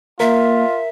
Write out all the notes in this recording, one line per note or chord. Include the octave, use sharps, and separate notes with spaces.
A#3 F4 A#4 E5